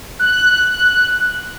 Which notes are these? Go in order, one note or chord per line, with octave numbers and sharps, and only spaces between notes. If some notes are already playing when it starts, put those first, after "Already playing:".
F#6